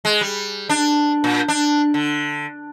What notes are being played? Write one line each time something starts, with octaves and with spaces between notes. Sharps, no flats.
G#3
G3
D4
A#2
D4
D3